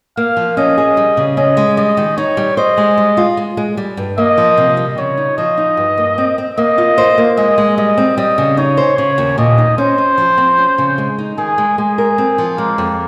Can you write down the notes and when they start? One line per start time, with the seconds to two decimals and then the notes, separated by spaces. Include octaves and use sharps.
0.17 A#3 F5
0.37 F3
0.57 C#4 D#5
0.78 G#4
0.97 G3
1.17 C#3
1.37 C#4 D#5
1.57 G#3
1.77 G3 D#5
1.97 D#3
2.17 D#4 C#5
2.37 G3
2.57 C5 D#5
2.77 G#3
2.97 G3
3.17 F4
3.37 G#3
3.57 G#3
3.77 G3
3.97 G2
4.18 A#3 D#5
4.38 F3
4.57 C3
4.77 G3
4.97 C#3 C#5
5.18 D#4
5.38 F3 D#5
5.57 D#4
5.77 G2
5.98 A#3
6.18 C4
6.38 C4
6.58 A#3 D#5
6.78 F4
6.98 C5
7.18 A#3
7.37 G#3 D#5
7.58 G#3
7.78 G3 D#5
7.98 C4
8.18 G3 D#5
8.38 C#3
8.57 D#4 C#5
8.77 C5
8.98 C#3 C#5
9.18 D#2
9.38 A#2 D#5
9.58 D#4
9.78 C#4 C5
9.98 C#4
10.18 F3
10.38 C4
10.58 C#4
10.78 C#3
10.98 G#3
11.18 D#4
11.38 D#3 G#4
11.58 G#3
11.78 G#3 G#4
11.98 A#4
12.18 C4
12.38 F3
12.58 G#3 A#3
12.78 F2